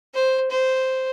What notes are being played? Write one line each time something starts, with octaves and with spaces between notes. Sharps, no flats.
C5
C5